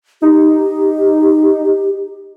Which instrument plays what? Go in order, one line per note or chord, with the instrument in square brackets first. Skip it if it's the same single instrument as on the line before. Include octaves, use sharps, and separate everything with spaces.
[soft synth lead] D#4 [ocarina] G4